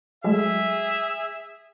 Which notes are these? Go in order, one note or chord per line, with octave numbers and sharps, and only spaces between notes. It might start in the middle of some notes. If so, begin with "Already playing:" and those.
F#3 G#3 A3 G#4 E5